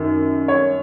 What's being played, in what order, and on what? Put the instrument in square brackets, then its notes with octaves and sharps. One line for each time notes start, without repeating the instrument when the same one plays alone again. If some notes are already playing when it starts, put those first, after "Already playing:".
Already playing: [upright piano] F#2 D#3
C#5